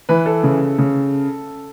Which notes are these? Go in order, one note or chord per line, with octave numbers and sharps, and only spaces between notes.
E3 B4
A4
C#3
C#3